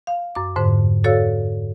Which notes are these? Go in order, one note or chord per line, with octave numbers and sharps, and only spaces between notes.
F5
F#2 D6
F2 G#2 D3 C5
F#4 A4 C#5 D5 F5 E6